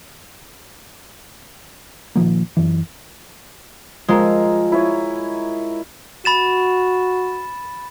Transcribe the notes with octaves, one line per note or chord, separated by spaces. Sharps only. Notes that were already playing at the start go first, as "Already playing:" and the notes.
A#2 D#3 F3 A#3
F#2 E3
F3 G#3 A#4 E6
E4 C#5 D#5
F#4 B5 A6 E7